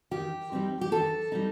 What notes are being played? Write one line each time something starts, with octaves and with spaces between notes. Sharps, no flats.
D#3 G4
G3 C4 D#4
G4
D#3 A4
G3 C4 D#4